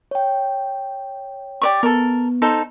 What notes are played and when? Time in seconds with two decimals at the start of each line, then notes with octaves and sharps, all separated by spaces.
0.11 C#5 G5
1.62 G4 D5 C#6
1.83 B3 A4 A#4
2.42 D#4 A4 C5